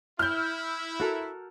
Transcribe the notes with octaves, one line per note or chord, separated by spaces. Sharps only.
E4 F6 G6
F#4 A4 A#4